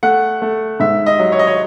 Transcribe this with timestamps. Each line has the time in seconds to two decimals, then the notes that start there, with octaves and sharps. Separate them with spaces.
0.03 A3 F#5
0.42 A3
0.80 G#2 E5
1.06 D#5
1.19 F#3
1.32 C#5
1.39 D#5
1.47 C#5